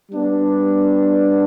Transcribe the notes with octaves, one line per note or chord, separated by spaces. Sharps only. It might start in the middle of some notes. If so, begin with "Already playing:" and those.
G3 B3 D4